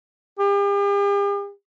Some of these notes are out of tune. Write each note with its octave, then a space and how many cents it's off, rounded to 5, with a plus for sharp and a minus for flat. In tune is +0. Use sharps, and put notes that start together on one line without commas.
G4 +45